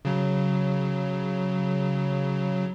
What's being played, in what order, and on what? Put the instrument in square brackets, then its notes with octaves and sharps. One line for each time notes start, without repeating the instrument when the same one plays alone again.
[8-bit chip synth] C#3 F#3